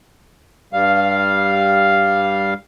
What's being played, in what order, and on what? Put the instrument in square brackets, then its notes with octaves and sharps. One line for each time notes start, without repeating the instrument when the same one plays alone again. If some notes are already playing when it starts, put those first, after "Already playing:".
[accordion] G2 G3 F5